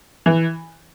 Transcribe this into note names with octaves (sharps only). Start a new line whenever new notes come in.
E3